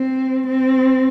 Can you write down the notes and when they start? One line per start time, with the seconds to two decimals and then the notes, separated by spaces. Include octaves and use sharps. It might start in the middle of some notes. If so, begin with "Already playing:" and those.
Already playing: C4
0.47 C4